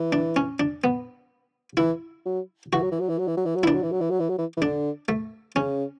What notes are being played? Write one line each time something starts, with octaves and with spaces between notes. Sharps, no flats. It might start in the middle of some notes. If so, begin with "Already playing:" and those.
Already playing: E3
D4
C#4
D4
B3
E3 E4
F#3
E3 F#4
F#3
E3
F#3
E3
F#3
E3
F#3
E3
F#3
E3 D4 E4
F#3
E3
F#3
E3
F#3
E3
F#3
E3
E3
D3 D4
A3
C#3 C#4